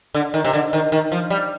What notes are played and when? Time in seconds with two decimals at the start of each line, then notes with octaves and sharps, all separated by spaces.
0.14 D3
0.34 D#3
0.45 C3
0.53 D3
0.73 D#3
0.92 D#3
1.12 F3
1.30 G3